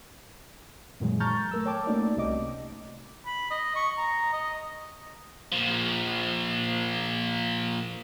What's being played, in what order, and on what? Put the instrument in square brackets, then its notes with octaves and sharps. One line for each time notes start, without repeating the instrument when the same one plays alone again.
[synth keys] F#2 A#2 D#3 E3 F#3 G#3
A5 A#5 C#6 F6 G6 A6
A3 A#4 E6
C#5 G5 A5 D6
A3 A#3 C#4 D#4 F#4 D5
C2 C3 D#5 D6
[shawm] B5
D#5
C#6
A#5
D#5
[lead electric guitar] A#2 F3